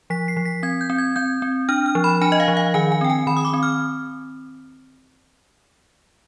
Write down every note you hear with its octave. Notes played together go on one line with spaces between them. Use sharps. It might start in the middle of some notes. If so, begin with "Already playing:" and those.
F3 B6
C7
F3
B6
C4 G#6
G6
C4
G#6
C4 G6
C4
D4 F6
F6
F3
B5
D4 G#5
D#5
F5
F3
F5
D#3 G#5
G#5
C4 G5
G#5
D#3 B5
D#6
D6
C4
F6